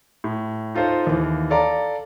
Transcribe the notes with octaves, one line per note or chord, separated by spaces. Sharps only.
A2
D#4 F4 A4 C5
D#2 E3
A4 D5 F5 A#5